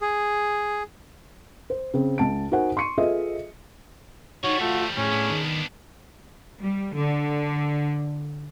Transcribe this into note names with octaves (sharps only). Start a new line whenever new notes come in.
G#4
C5
C#3 C4
C#2 A5 D7
D#4 F#4 A#4 C5 F#5 G#5
C6 C#6 C#7 D#7
F4 G#4 A4 B4 D#5 E5
F3 G3 D#4 F#4 C#5
A3 F4
A2 C#4 G#4
B3 D4
D#3
G3
D3